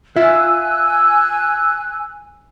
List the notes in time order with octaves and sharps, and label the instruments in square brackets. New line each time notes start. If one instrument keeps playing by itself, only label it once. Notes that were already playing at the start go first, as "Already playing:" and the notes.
[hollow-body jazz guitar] F4 E5 [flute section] G#5 E6 F#6